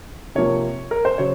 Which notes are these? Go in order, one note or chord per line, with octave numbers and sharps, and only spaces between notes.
C3 F3 A#3 C#5
A#4
C5
C#3 F#3 C#5